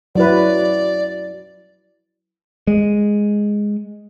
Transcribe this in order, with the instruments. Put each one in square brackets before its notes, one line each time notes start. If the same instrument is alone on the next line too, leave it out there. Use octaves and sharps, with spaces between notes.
[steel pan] F#3 E4 B4 [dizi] D5
[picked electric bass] G#3